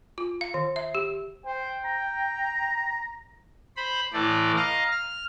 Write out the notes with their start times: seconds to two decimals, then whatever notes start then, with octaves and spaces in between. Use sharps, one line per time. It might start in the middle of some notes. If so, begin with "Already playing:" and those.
0.18 F4
0.41 F5
0.54 D#3
0.76 E5
0.95 G4
1.46 C5 G5
1.85 A#5
3.77 C5 B5
4.13 A2 E3 A3 D5
4.56 D#5 F5 A#5
4.92 F6